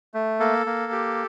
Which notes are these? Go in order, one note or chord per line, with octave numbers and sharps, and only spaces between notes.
A3
A#3 A4
A#3
G4